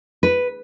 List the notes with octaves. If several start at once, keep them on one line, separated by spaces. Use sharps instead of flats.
B4